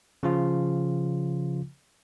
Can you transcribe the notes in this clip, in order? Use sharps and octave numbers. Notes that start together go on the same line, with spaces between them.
C#3 F3 F4